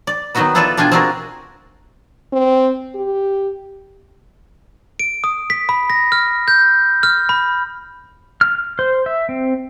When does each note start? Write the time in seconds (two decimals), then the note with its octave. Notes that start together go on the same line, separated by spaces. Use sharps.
0.07 D5
0.35 D#3 F#3 B3 D#4 F#4 B4
0.55 E4 F4 A4 B4 D5 E5
0.77 B2 D4 F4 G5 G#5
0.92 C4 D4 F4 F#4 G#4 A#4
2.33 C4
2.95 G4
5.00 D7
5.24 D#6
5.50 B6
5.69 B5
5.90 A#6
6.12 F6
6.48 G6
7.03 F6
7.29 B5
8.41 F6
8.79 C5
9.06 E5
9.29 C4